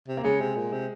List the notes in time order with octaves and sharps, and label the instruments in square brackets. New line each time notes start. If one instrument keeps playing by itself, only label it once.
[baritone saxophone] C3
[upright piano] A#3
[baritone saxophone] C#3 [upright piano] G#3
[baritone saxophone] C3
A#2
C3